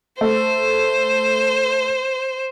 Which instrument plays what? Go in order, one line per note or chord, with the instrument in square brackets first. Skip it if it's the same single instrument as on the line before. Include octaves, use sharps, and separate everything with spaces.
[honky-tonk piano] A3 [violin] C5